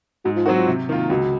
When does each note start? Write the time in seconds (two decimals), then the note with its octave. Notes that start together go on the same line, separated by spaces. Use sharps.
0.25 G#2 F#3
0.36 F3
0.46 D#3 F#3 C4 F#4
0.57 F3
0.67 C3
0.89 D#3 A#3 F4
1.10 C#2 F#3